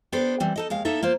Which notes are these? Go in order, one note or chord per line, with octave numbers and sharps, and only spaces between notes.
B3 D4 G4 A4 B4 C5
E3 G3 C4
D#4 A4 D#5
D#2 G#3 F5
A#3 D#4 A4 E5
A#3 F4 C5